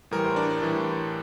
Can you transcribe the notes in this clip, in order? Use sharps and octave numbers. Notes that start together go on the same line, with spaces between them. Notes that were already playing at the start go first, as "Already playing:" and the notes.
A2 E3 G3 A#4
C5
D4 D5
A2 E3 G3